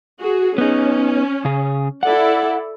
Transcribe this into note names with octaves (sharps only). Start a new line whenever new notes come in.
F#4 G#4
B3 C#4 D#4
C#3 G#4
E4 A4 D5 F#5